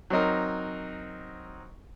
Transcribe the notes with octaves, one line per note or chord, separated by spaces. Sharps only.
F#3 C4 D#4 A#4